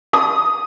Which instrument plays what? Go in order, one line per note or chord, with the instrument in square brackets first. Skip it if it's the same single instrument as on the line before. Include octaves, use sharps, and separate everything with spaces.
[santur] D#6